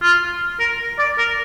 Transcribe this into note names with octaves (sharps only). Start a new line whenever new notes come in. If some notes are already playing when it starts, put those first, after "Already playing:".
F4
A#4
D5
A#4